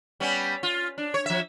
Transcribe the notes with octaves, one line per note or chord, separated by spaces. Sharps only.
G3 B3 C#4
F4
D4
C#5
F3 E5